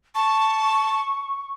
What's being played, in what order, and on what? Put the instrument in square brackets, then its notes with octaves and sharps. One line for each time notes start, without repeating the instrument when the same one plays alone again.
[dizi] A5 [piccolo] C#6